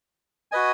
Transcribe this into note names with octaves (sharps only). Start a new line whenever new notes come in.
F#4 B4 D#5 G#5